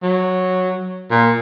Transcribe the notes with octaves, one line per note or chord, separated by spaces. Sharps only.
F#3
A#2